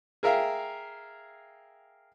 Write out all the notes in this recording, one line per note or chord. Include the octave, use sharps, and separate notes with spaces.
G#4 A#4 E5 F5 G5